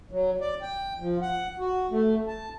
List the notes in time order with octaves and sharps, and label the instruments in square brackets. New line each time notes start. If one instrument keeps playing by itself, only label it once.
[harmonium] F#3
D5
G5
F3
F#5
F#4
A3
A5